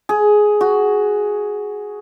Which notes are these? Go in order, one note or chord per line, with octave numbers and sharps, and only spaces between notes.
G#4
F#4